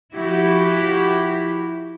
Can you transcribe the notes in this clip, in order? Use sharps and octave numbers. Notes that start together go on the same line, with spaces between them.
F3 E4 F#4 G4